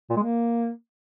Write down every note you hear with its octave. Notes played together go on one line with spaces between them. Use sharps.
A#2
G#3
A#3